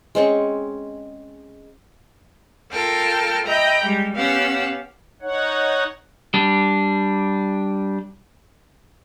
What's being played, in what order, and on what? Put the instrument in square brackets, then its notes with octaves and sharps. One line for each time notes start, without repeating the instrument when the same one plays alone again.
[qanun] G#3 C4 C#4 C#6
[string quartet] F4 A4 A#4 G5 A5 F6
D#5 E5 G5 A#5 B5
G3 G#3 G4
B3 C#4 G4 F5 F#5 E6
[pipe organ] D#4 C#5 F#5
[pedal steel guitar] G3 D4